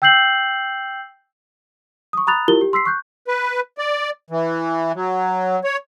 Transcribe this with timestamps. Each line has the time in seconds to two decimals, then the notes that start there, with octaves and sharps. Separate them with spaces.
0.02 G5 E6 G6 C7 F#7
2.13 C#6 D#6
2.27 A#5 B5 D#6 F#6 A6 F7
2.48 E4 F4 G4 A#4 G7
2.61 G4
2.73 C6 E6 B6 C7
2.86 C#6 F#6 G6
3.28 B4
3.78 D5
4.30 E3
4.95 F#3
5.64 C#5